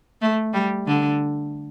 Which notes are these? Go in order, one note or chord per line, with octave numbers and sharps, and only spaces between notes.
A3
G3
D3